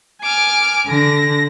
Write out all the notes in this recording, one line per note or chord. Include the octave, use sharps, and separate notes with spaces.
G#5 D6 F6
D3 A#6